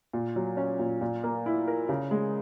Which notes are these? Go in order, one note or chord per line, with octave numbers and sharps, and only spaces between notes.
A#2
F#3
C#4
A#2
A#2
A#3
E4
A#4
C#3
G#3